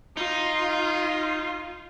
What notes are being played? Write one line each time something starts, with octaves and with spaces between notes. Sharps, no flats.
D#4 F4